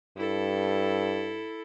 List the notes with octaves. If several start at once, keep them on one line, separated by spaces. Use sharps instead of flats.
G2 E4 A4